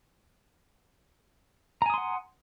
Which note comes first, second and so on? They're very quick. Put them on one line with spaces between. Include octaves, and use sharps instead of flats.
A#5 G#5 D#6 C6 F#5